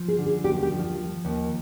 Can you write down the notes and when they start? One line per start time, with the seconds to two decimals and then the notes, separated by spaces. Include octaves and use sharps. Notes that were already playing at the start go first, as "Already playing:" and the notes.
Already playing: F3
0.08 G#4
0.18 D3
0.26 G#4
0.44 D#2 G4
0.63 G4
0.71 F3
0.80 F4
0.98 F3
1.25 D#2